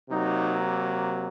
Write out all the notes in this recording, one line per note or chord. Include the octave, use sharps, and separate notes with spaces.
C3 F#3 A#3 D#4